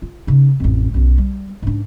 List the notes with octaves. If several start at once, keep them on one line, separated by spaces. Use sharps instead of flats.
F4
C#3 D#4
A1 F2
B1 F#2
G3
G#2 D4